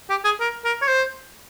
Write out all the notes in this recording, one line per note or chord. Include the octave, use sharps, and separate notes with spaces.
G4
G#4
A#4
A#4
C#5
C5